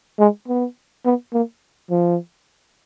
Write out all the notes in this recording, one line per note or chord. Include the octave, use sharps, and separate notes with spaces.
G#3
B3
B3
A#3
F3